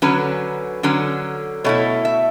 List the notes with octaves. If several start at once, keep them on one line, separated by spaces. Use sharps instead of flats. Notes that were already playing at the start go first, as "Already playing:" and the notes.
D3 F#3 C#4 B4
D3 F#3 C#4
B2 A3 E4 C#5
E5